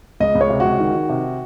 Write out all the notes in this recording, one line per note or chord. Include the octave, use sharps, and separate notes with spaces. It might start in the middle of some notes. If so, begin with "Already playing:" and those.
C#2 D#5
C#2
C#5
C3
C#2 F#4
D#3
D#3
C3